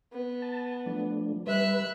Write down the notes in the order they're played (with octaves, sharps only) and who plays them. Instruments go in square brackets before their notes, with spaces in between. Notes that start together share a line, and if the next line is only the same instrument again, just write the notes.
[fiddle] B3
[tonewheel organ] A5
F3 A3 D4
[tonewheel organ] G3 B4 [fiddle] E5 F#6